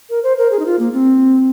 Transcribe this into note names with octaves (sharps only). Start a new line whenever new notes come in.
A#4
C5
A#4
G#4
D#4
F4
A#3
C4